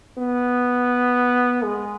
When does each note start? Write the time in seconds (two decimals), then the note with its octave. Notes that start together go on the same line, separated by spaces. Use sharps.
0.18 B3
1.63 G#3